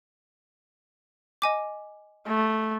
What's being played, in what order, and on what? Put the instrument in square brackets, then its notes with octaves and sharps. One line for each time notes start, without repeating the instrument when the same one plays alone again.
[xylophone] D#5 G#5 D6
[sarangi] A3